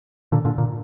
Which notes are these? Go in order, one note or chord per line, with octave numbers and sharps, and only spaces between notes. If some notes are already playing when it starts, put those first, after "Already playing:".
A#2 D3
A#2 D3
A#2